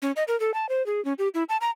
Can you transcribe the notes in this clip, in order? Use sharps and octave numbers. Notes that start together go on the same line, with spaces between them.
C#4
D#5
A#4
A4
A5
C5
G#4
C#4
G4
E4
A5
A#5